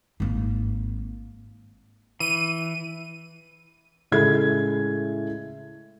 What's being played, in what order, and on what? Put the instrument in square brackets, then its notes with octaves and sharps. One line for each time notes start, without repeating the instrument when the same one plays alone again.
[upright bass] G#1 A#3
[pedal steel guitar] E3 [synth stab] D#7
[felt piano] A2 C#3 G#3 A3 E5 G#6